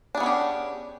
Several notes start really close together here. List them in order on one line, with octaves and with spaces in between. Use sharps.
D4 G#4 B3 C#4 G4